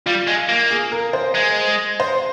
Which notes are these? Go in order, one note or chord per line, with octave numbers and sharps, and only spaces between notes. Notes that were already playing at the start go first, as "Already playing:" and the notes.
G3 F4
G#3
A#3
G#4
A#4
C5
G#3
C5